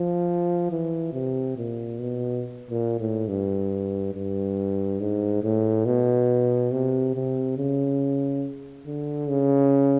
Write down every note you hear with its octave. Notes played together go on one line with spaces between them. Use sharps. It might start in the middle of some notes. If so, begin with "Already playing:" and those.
Already playing: F3
E3
C3
A#2
B2
A#2
A2
G2
G2
G#2
A2
B2
C3
C3
C#3
D3
C#3